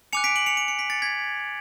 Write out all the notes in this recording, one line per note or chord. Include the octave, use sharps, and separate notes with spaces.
G#5 D6 F#6 C#7 F7
B6 D7
D7 F#7
C#7 F7
D7
C#7
B6
A6 C#7
G#6 B6